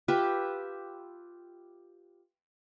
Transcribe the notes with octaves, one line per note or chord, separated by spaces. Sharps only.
F4 G4 B4 E5